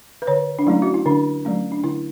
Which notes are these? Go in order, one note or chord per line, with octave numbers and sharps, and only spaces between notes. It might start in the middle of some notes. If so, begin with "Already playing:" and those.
B4
D3 C#5
D4
F#3 A3 C#4 E4
F#4
E4
D3 D4
F#3 A3 C#4
D4
D3 E4